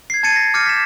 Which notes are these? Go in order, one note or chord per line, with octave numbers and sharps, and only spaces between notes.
G#6 C7
A5 G#6 A6 C#7 D#7
A#6
D6 F6 G6 A6 C#7 D#7
B6 E7